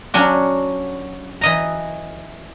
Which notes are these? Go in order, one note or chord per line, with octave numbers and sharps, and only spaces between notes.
F#3 C#4 D4 F#4
E3 D#5 A#5